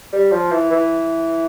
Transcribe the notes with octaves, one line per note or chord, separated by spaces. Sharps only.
G3
F3
E3
E3